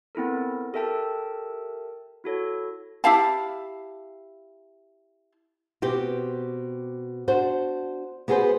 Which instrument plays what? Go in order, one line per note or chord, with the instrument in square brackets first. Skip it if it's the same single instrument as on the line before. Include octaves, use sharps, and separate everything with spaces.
[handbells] B3 C4 E4 A4 A#4
G4 A4 A#4 E5 G5 A5
E4 F#4 A4 C#5
[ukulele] E4 G4 F5 A5
[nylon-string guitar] B2 C4 G4
D4 F#4 C5
B3 F#4 G#4 A4 B4 C5